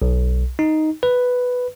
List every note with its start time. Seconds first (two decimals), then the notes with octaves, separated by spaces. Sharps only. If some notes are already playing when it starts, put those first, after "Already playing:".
0.02 B1
0.59 D#4
1.03 B4